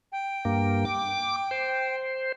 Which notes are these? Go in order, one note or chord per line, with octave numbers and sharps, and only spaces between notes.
G5
G2 A#3
D6
C5